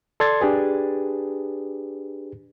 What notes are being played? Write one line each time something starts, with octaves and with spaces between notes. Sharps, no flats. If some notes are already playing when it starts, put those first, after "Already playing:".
A4 D5 C6 G#6 A6
D4 G4 G#4 B4